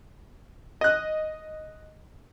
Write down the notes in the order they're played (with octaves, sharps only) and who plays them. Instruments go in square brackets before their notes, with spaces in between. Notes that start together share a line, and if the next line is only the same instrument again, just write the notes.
[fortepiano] D#5 F#6